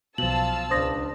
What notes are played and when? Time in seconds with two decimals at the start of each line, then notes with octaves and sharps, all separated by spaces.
0.18 B1 B2 F3 F5 A5 E6 F#7
0.71 C#2 D4 C5 D#6 A#6